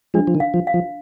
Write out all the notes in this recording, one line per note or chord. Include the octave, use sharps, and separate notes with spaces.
F3 G#3 D4
F3
D#3
F5
F3
F5
F3